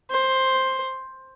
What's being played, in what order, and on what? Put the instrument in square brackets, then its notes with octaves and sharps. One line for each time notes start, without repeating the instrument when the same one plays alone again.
[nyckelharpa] C5